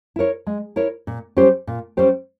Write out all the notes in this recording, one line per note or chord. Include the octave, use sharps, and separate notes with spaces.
E4 A#4 C#5
G#3
E4 A#4 C#5
A#2
G3 C#4 G4 C5
A#2
G3 C#4 G4 C5